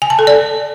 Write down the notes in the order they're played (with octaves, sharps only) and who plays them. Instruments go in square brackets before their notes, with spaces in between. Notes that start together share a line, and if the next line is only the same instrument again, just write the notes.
[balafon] G#5
A5
A4
D5